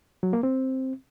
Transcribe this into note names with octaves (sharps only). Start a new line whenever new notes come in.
F#3
A#3
C4